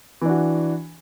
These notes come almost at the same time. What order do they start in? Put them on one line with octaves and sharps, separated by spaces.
E3 D4 F#4